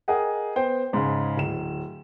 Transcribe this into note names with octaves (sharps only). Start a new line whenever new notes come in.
G#4 A#4 D#5 F#5 G5
B3 C5 G5
G#2 C#3
D1 E7